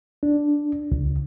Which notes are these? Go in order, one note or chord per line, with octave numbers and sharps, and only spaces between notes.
D4
C#2